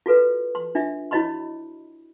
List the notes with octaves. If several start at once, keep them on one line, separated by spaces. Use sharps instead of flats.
F4 F#4 A4 B4
C6
D4 F4 E5
E4 F#4 C#5 D#5 B5 C6